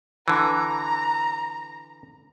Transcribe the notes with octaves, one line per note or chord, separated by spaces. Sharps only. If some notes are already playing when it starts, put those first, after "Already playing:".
D3 E3 A#5